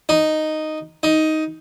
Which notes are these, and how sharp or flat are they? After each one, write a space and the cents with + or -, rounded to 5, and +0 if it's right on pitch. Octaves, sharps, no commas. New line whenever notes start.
D#4 -5
D#4 +10